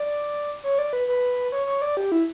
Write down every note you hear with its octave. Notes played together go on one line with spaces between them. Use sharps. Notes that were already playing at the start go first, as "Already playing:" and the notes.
Already playing: D5
C#5
D5
B4
B4
C#5
C#5
D5
G4
E4